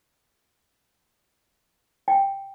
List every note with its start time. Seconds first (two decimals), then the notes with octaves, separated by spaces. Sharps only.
2.08 G5